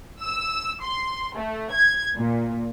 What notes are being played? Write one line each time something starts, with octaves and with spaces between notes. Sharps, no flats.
E6
C6
A3
G#6
A#2